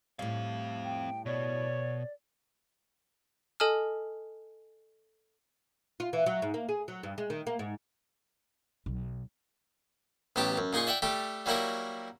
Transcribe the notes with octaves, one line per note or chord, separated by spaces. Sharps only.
A2 G3 C4 F5
G5
B2 C#5 D5
A4 D#5 G#5 A5 D#6 F6
F4
E3
F#3
G#2
A#3
G#4
F#3
G2
G#3
D#3
A#3
G#2
B1
A1 F#3 B3 G4 A5 D6
F#2
A#2 D#4 G#4 C6 C#6
D5 E5 F#5 G5
G3 A3 G4 D6
F#3 G3 A#3 E4 F#4 A#4